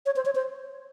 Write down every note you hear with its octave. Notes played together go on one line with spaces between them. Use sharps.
C#5
C5
C#5
C5